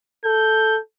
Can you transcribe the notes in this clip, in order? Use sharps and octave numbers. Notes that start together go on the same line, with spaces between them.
A4 G6